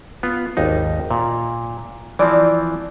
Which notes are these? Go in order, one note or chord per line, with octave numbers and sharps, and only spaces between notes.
B3 F4
G#1 D#2 D#4
A#2
E3 F3 C4 D5